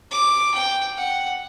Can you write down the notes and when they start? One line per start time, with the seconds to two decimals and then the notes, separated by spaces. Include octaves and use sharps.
0.11 D6
0.54 G5
0.97 F#5